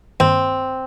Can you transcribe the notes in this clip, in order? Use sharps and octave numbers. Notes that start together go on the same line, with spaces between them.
G2 D#3 A#3 C4